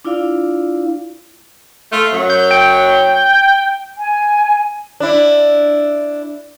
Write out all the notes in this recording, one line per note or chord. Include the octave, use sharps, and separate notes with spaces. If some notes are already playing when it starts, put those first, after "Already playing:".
D4 E4 F4 D5 F5
A3 F4
F#2 F#3
G6
G5
G#5
D4 E4